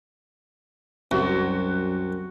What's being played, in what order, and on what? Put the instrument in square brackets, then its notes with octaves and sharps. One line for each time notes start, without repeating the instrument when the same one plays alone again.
[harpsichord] C2 [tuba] F#2 [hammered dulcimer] F#4